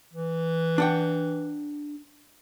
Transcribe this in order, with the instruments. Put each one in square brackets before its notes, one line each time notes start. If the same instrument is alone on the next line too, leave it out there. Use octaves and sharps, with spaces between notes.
[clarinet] E3
[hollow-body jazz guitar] D4 F#5 G5